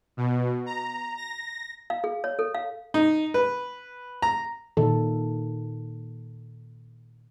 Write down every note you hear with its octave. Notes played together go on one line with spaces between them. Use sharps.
B2
A#5
A#6
F5
G#4
C#5
A4
F5
D#4
B4
A#5
A#2 D#3 A4